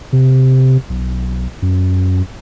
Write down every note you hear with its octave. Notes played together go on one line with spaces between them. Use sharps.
C3
B1
F#2